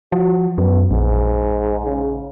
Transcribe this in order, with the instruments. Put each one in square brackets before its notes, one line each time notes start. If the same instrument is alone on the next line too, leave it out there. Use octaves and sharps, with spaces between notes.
[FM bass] F3 [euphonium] F#4
[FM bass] F#2 [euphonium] B3
[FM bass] A#1 [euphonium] G#2
[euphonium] C#3